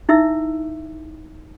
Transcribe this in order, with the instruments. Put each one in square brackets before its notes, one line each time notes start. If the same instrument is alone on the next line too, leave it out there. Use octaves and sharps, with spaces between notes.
[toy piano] D#4 E4 E5 E6